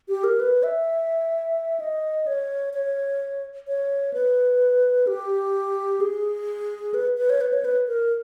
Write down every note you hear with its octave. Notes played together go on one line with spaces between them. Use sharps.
G4
A#4
B4
E5
D#5
C#5
C#5
C#5
B4
G4
G#4
B4
B4
C#5
B4
C#5
B4
A#4